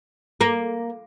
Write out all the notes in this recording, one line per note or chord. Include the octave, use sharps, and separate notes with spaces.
A#3